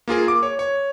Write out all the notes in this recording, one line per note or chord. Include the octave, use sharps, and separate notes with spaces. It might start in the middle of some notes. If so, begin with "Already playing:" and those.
A#3 F4 G#4 A#4
D6
C#5
C#5